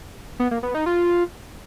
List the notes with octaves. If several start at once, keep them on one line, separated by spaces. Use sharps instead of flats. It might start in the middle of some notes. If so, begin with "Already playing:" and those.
B3
A#3
B3
D#4
F4